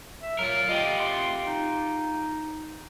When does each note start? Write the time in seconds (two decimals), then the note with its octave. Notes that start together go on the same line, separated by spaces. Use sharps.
0.21 E5
0.39 F#3 F4 A#4
0.69 F4 G4 D#5
0.99 C6
1.45 D#4